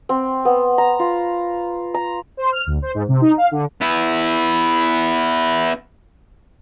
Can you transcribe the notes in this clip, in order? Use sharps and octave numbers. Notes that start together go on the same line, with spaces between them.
C4
B3
A#5
F4
A#5
C5
F6
D2
C5
G#2
C3
D#4
F5
D3
B3 E4